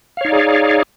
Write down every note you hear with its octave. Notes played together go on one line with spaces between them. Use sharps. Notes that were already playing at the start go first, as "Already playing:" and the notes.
D#4 G#4 C#5 D5 F5